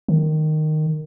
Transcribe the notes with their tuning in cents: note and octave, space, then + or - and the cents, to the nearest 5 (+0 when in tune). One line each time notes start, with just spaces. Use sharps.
D#3 -10